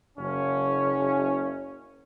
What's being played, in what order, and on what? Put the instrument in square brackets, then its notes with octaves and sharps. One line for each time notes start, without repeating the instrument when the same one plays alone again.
[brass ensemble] F#1 C#4